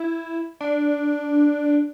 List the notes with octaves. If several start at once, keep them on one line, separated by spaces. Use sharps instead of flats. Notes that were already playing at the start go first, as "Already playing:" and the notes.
Already playing: E4
D4